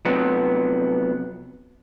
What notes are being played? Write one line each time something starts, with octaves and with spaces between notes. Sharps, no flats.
C3 F3 F#3 B3